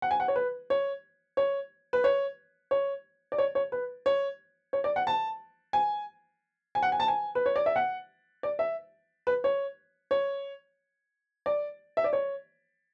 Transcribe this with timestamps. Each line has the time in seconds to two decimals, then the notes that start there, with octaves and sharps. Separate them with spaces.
0.02 F#5
0.11 G#5
0.20 F#5
0.28 C#5
0.36 B4
0.70 C#5
1.37 C#5
1.93 B4
2.04 C#5
2.71 C#5
3.32 D5
3.38 C#5
3.55 C#5
3.72 B4
4.06 C#5
4.73 C#5
4.84 D5
4.96 F#5
5.07 A5
5.73 G#5
6.75 G#5
6.83 F#5
6.92 G#5
7.00 A5
7.08 G#5
7.35 B4
7.46 C#5
7.56 D5
7.66 E5
7.76 F#5
8.43 D5
8.59 E5
9.27 B4
9.44 C#5
10.11 C#5
11.46 D5
11.97 E5
12.04 D5
12.13 C#5